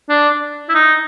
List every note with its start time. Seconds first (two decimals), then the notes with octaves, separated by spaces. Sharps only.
0.09 D4
0.69 E4
0.74 D#4